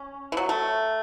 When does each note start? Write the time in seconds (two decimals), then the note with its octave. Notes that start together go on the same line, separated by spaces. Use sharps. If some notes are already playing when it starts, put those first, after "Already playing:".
Already playing: C#4
0.32 E3
0.37 F#3
0.49 A3